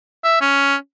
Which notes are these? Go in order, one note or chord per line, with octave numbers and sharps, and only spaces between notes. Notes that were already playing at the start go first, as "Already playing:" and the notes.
E5
C#4